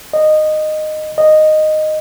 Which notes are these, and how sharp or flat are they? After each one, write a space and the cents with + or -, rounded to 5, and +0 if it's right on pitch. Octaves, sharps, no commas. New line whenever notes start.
D#5 -15
D#5 -10